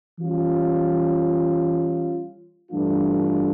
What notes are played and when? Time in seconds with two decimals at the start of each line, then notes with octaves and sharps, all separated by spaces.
0.18 E3 G3 C#4 F4
2.69 G2 E3 A3 D4 F4